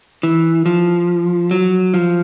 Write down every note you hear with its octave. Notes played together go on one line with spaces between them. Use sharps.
E3
F3
F#3
F3